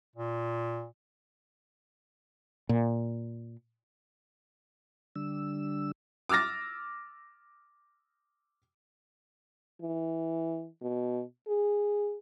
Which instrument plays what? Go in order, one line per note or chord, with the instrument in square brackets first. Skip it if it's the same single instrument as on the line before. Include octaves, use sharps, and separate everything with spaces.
[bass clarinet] A#2
[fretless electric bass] A#2
[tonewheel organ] D3 G3 D4 E6
[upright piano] D6 E6 F6 A6 A#6
[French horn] E3
B2
G#4